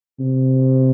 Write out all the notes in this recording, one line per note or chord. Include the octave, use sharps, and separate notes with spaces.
C3